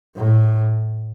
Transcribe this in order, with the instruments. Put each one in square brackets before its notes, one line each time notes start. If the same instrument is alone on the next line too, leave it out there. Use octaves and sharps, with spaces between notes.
[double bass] A2